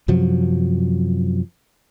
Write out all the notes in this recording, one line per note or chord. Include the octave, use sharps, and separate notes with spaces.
F#2 C3 F3 F#3